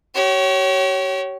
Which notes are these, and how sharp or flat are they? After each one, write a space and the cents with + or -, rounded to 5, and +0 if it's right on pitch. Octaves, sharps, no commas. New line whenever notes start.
G4 -40 C#5 +0